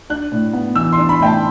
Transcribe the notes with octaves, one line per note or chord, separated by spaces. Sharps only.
D4 F#6
A2
B3
E3 E6
C6
D4
B5
A2 G5
A5